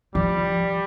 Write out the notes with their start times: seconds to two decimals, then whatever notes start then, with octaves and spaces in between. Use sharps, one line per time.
0.15 F3 G3